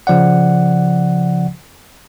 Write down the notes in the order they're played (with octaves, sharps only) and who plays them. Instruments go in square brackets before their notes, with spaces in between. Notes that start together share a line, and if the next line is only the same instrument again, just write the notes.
[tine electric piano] C#3 F3 D5 F#5